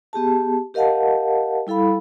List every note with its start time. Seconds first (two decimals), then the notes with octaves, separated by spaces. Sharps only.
0.13 B3 G4 G#4 A5
0.74 G4 A#4 D#5 F5 F#5 A5
1.67 G3 E4 A4 F5 B5